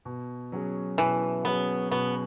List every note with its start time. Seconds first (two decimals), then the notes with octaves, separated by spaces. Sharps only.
0.05 B2
0.52 F#3 C#4 G#4
0.98 B2 E3
1.45 F#3 B3 C#4 G#4
1.91 B2 B3